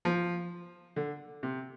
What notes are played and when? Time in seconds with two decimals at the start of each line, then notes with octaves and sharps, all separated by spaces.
0.05 F3
0.96 D3
1.43 C3